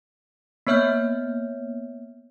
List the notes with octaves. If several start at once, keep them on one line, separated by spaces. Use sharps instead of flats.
A#3 B3 C#5 E5 F6 G6